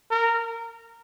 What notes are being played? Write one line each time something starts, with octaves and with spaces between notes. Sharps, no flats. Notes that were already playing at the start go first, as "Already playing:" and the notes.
A#4